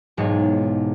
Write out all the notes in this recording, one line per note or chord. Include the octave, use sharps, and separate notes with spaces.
E1 B1 G#2 B2 G#4 C#5